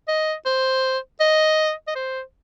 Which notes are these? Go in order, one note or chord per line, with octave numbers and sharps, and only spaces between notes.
D#5
C5
D#5
D#5
C5